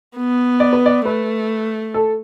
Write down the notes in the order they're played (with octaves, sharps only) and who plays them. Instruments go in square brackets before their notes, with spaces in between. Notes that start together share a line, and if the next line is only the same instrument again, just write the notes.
[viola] B3
[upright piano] D5
B4
D5
[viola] A3 [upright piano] B4
[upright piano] A4